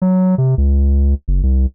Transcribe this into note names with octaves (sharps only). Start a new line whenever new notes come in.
F#3
C3
C#2
F#1
C2